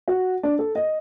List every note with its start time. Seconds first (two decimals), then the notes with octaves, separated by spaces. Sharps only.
0.08 F#4
0.43 D4
0.59 A4
0.75 D#5